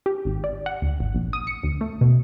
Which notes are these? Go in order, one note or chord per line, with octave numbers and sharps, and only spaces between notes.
G4
G#1
D5
F#5
D2
G#1
A#1
D#6
C#7
D2
A3
B2